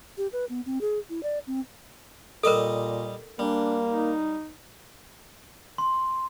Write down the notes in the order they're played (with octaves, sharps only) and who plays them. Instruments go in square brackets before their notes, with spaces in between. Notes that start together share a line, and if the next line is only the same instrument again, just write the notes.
[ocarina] G4
B4
B3
C4
G#4
E4
D5
C4
[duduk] A#2 [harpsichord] G3 D#5 D6 [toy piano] A4 A#4
[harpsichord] G3 [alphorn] A#3 [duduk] D4
[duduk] D#4
[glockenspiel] C6